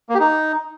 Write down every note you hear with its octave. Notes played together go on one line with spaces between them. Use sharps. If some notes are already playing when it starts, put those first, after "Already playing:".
A#3
G4
D#4